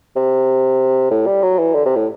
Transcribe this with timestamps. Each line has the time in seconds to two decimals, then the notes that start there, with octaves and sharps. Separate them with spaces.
0.16 C3
1.11 A2
1.26 G3
1.43 F#3
1.59 E3
1.75 D3
1.85 C3
1.96 A2